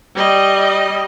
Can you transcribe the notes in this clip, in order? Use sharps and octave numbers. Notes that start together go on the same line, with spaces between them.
G3 D#5